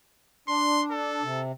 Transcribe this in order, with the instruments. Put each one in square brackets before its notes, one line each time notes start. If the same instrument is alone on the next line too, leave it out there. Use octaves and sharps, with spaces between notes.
[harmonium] D4 [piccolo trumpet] C6
[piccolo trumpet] A4
[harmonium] C3